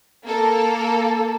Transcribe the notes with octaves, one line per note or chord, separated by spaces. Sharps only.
A#3 A4